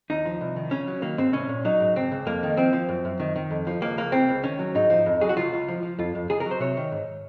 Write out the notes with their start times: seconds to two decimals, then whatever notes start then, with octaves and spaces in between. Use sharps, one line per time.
0.10 D#2 D#4
0.26 F3
0.41 C2
0.56 D#3
0.71 C#3 C#4
0.87 F#3
1.02 D#3 A#3
1.18 G#2 C4
1.33 C2 C#4
1.49 A#2
1.65 F#3 D#4
1.80 G#2
1.96 C#2 C4
2.12 C#2
2.26 F2 A#3
2.43 D#3
2.57 F3 C4
2.73 F3
2.89 F#2
3.05 F#2
3.19 D#3
3.36 D#3
3.51 F2
3.67 F3
3.82 C#2 A#3
3.98 C#2 A#3
4.12 C#2 C4
4.29 C#2
4.44 D#3 C#4
4.59 F#3
4.75 G#2 D#4
4.90 F3
5.06 F2
5.21 F#3 G#4
5.29 F#4
5.37 C#2 F4
5.52 C#2
5.68 F3
5.83 F3
5.99 F2 F4
6.15 F2
6.29 C#2 G#4
6.40 A#4
6.46 F#3
6.51 C5
6.60 C3 C#5
6.77 D#3
6.92 G#2